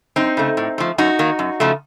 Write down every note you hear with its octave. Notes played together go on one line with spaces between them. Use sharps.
F#2 C4 D#4
C#3 A3
A2
F3 A3
F#2 D#4 F#4
D#3 A#3
F#2
C#3 F3 A3